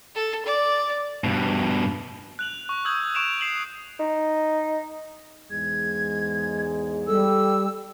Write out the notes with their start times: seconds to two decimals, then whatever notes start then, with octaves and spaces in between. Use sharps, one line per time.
0.15 A4
0.45 D5
1.24 G2 B2
2.39 F#6 F7 F#7
2.69 C#6
2.85 D#6 E6 G6 G#6 F#7
3.15 C#6 D7 E7 F7
3.41 C7 E7 F#7
3.99 D#4
5.51 E2 G#2 G#3 G#6
7.07 G3 A4 E6